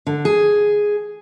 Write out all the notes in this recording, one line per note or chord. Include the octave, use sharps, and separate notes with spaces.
D3
G#4